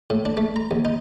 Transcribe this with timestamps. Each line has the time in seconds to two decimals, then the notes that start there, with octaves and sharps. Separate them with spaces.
0.10 A2
0.25 D4
0.37 A3
0.56 A#5
0.71 D#2
0.85 D#4